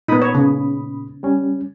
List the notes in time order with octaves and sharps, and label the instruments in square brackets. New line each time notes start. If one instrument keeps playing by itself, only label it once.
[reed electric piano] A#2 B5 D#6 [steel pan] B3 D#4
[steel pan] C#5
C#3
[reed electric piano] G3 C#4